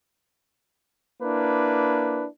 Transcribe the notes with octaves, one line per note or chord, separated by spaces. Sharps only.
A#3 D4 E4 B4